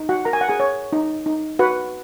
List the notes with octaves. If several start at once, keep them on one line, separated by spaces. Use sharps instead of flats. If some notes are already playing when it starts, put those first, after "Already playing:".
Already playing: D#4
F#4 F#5
A#4 A#5
G#5
F#5
G#4 G#5
C#5
D#4
D#4
F#4 B4 F#5